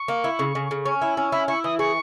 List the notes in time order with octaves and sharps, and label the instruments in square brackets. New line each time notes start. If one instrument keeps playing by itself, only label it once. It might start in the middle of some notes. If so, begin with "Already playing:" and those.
Already playing: [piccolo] C#6
[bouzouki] A#3
E4
C#3
C#3
C#3
C#4
E4
C#4
[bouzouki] E4 [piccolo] B5
[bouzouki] E4 [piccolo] C#6
[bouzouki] E3 [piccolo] D#6
[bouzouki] G#4 [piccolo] C#6